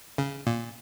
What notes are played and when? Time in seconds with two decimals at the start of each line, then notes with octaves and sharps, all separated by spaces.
0.18 C#3
0.47 A#2